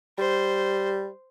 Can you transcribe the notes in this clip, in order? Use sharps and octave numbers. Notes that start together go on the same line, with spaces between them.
G3 C5